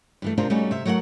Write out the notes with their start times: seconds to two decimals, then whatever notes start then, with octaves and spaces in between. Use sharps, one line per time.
0.22 G2 E3 A3
0.38 C3 C4 D4 F4 A#4
0.50 G3 A3 C#4 D#4 F#4
0.71 C3 E5
0.85 F#3 A3 A#4 F5 F#5